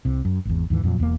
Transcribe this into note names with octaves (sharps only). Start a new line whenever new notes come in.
C2 C3
F#2
G#1 E2
D#2 G#2 E3
F2 A#2 F#3
E1 E2 G3 A#3